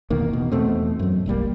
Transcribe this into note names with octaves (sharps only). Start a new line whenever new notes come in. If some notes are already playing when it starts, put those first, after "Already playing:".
E2 B2 D#3 A#3
B2
E2 B2 A3 C4
F#2 F#3
E1 B1 G3 A#3